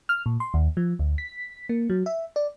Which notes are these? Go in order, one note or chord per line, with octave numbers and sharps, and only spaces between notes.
F6
A#2
C6
D#2
F3
D2
B6
A#3
F#3
E5
D5